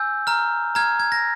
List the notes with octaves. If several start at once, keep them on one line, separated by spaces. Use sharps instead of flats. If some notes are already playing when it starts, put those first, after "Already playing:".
Already playing: G#5 E6 G6
A#5 F6
A#5 F6 G#6
G#6
A#6